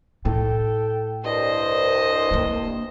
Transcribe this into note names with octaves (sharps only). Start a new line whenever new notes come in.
A2 A4 G5
C2 G2 C5 D#5
A#3 D4